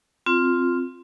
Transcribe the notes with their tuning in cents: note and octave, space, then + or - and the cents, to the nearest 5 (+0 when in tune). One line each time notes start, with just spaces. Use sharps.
C4 +0 F4 +0